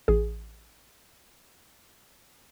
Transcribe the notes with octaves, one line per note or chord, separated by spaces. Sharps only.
A1 G#4